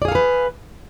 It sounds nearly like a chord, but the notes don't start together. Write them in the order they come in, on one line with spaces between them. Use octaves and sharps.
D5 G#4 F5 A4 B4